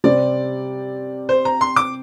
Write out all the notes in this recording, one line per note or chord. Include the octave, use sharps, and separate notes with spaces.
C3 G3 C4 D5
C5
A#5
C6
D6